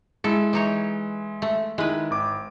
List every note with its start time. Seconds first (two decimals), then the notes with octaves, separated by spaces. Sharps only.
0.24 G#3 E4 A4
0.53 E3 D#4 C#5
1.42 A3
1.78 D#3 G#3 E4 B4
2.11 G#1 D6